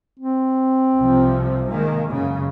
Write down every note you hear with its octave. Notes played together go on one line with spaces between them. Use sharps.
C4
C2 C3 F3
D#3 G#3 A#3
F#2 C#3